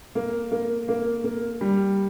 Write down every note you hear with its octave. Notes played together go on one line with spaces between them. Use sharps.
A#3
A#3
A#3
A#3
G3